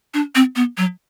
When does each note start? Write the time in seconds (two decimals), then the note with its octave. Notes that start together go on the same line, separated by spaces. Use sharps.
0.14 D4
0.35 C4
0.56 B3
0.77 F#3